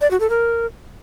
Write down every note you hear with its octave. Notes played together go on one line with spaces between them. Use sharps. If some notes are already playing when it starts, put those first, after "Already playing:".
D5
F#4
A4
A#4